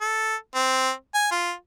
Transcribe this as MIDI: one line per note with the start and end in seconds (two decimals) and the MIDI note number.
0.01 0.35 69
0.55 0.91 60
1.14 1.29 80
1.31 1.52 65